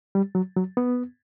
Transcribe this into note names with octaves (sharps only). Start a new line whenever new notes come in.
G3
F#3
F#3
B3